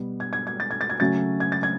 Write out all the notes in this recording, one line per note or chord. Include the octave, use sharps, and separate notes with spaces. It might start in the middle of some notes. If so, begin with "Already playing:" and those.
Already playing: B2 G3 B3
G#6
G#6
G#6
A6
G#6
A6
G#6
C#3 F#3 A3 C#4 A6
G#6
A6
G#6